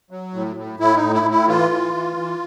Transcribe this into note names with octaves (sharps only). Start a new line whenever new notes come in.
F#3
A2
A2
A2 E4
D#4
A2
E4
A2
E4
E3 F4
E3
E3
E3